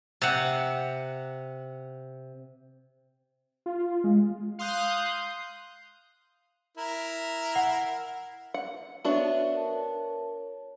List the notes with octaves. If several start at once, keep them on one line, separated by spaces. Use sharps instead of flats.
C3 F#5
F4
G#3
F5 C6 D#6 F#6 G6
E4 A#4
F#5
F#5
B3 D4 F#4 C#5 D5 E5
A#4 C#5 A5